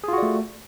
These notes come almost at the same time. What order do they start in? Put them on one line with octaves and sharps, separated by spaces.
G#4 F4 F#4 D5 A3